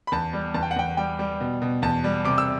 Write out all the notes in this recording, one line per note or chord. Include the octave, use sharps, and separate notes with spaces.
B5
E2 A5
G3
E2 A5
G5
F#5
E2 G5
G3 G5
G3
B2
B2
E2 A5
G3
C3 D6
E6